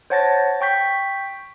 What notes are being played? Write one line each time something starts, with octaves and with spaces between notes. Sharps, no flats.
C5 C#5 F#5 A5 A6 A#6
G5 C#6 G6 B6